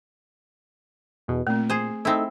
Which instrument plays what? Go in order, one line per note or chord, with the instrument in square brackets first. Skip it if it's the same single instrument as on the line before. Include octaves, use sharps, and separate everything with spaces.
[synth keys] E2 B2
[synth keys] A#2 [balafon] A3 C4
[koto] G#4 C5
[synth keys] A3 D#4 [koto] C4 E4